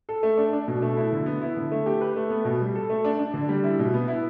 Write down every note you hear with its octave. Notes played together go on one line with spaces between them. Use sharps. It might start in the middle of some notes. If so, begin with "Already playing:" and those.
A4
A3
D4
D4
B2
A3
E4
D3
B3
E4
D3
A3
G4
B4
A3
B3
B2
G3
A4
A3
D4
D4
D3
G3
E4
B2
B3
E4